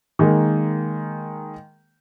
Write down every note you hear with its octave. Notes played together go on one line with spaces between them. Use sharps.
D#3 G#3 A#3